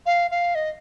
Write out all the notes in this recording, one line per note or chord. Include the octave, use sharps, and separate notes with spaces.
F5
F5
D#5